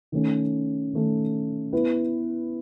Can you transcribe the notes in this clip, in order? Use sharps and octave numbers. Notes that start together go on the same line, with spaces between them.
D#3 A3 C#4
D#3 A3 C#4
B3 E4 B4